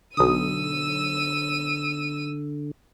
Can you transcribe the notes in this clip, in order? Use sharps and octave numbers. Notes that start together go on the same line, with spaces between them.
B1 D3 D#6 E6 D#7